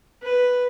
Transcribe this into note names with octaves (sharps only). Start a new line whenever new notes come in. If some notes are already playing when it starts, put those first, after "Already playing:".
B4